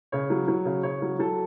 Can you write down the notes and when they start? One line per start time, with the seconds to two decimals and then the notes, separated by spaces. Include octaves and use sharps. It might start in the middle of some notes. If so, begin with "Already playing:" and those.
0.12 C#3 C#5
0.30 F#3
0.48 F#3
0.65 C#3
0.83 C#3 C#5
1.02 F#3
1.19 F#3 A4